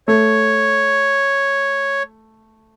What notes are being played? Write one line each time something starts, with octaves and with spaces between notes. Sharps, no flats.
A3 C#5